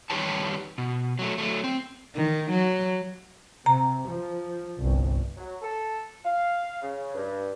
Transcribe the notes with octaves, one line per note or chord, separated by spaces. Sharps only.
D#3 G3 G4 B4 C#5 A5
B2
F#3 A3
F#3 A3
C4
D#3
F#3
C3 A#5
F3
G1 C2
F#3
A4
F5
C#3
G2